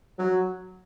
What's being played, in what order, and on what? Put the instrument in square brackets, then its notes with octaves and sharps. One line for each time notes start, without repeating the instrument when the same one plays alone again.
[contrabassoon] F#3